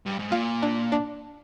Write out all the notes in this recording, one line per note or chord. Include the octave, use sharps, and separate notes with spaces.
G2
G#2
A#2 F4
D4
D4